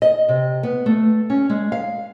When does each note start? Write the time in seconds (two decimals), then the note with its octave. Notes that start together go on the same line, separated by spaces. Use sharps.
0.02 D#5
0.29 C3
0.63 B3
0.86 A3
1.30 C#4
1.50 G#3
1.72 F5